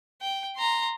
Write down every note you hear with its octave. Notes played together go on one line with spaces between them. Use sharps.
G5
A#5 C6